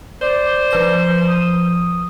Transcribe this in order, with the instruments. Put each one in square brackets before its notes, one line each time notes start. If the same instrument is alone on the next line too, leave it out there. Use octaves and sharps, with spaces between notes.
[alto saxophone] C5 [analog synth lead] D5
[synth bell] F3 B4 G7
[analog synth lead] D#6